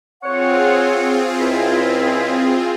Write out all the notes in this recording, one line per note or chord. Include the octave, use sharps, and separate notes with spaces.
C4 F4 G#4 C#5 F#5
C#2 E4